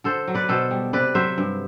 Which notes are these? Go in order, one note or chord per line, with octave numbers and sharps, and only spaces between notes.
D3 A4 C5
F#3
B4 D5
B2 A4 C5
G3
C3 B4 D5
F#3 C5 E5
G2